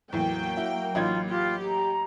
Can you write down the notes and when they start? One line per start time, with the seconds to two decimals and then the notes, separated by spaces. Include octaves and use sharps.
0.13 E2 A2 F#3 A#3 G5
0.57 E4 F#4
0.95 A1 D#4 F4 G#6
1.29 F4 G4
1.64 A#5